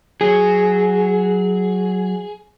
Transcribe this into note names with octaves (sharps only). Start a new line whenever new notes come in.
F#3 G#4